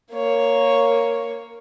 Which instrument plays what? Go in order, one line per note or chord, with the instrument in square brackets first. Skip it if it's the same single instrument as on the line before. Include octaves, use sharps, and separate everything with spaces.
[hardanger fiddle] A#3 C#5